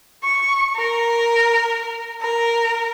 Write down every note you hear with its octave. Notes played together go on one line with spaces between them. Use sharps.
C#6
A#4
A#4